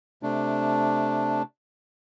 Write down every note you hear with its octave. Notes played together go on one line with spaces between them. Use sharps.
C3 A3 D4